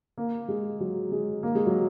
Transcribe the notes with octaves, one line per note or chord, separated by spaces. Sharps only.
A#3
G#3
F#3
G#3
A#3
G#3
F#3